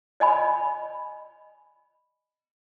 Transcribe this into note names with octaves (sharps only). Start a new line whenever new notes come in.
D5 D#5 G#5 B5